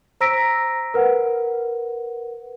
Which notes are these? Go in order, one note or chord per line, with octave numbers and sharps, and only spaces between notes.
C5 A#5 E6 A#6 B6 D7
A#4 B4 F#5